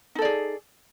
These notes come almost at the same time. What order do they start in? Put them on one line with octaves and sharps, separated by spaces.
D#4 A4 D5 G#4